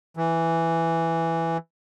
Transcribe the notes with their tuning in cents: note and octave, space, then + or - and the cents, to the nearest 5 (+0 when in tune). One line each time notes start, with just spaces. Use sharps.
E3 +5